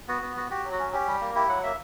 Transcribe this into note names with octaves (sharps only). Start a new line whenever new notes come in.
B3 F#4
B3
F#4
F#4 G4
F#3
F#4
C#4
C#4 G4
G3
A#3
E4 G4
F#3 F#5
A#3 E5